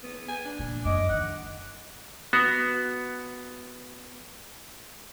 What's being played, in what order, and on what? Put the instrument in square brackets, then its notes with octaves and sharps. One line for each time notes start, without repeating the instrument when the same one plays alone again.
[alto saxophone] B3
G#5
D4
[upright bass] A#2
[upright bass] F#2 [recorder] D#5 [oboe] D6
[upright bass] D#3 [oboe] F#5
[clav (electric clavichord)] B3 F#4